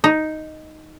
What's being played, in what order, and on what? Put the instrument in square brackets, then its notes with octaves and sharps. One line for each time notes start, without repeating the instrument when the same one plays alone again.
[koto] D#4